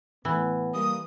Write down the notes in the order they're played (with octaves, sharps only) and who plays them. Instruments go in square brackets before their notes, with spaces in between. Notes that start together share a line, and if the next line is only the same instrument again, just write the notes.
[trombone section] A2 B3 [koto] E3
[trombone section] G3 A#3 [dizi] D#6